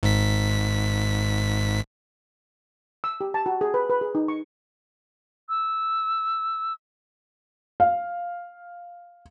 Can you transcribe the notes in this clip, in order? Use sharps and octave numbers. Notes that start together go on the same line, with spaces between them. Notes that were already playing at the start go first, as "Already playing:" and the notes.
G#1 G#2 B6
E6
G4
A5
F#4
G#4
B4
B4
G#4
D#4
C#6
E6
F5